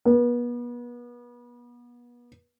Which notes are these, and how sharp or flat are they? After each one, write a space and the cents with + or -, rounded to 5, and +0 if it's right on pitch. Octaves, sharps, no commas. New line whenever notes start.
B3 -35